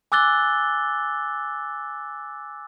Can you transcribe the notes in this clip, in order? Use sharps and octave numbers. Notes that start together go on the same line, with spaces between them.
G#5 D6 E6 F#6 A6 G7